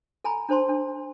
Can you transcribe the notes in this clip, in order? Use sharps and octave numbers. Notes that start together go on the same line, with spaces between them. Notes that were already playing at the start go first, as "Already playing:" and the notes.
A4 G#5 A#5 B5
D4 A4 C5 A5 C6
D4 A4